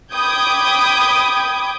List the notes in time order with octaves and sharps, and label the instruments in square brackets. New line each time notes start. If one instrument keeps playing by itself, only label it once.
[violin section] G5 B5 D6 D#6 G6 G#6